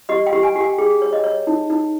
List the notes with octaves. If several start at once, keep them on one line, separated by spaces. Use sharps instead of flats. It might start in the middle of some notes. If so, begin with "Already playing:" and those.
G4 D#5
G5
G4
G#5
G4 G5
G#4
C#5
D#5
C#5
D#4
D#4